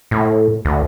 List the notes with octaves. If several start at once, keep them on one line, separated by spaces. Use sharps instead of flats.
A2
D2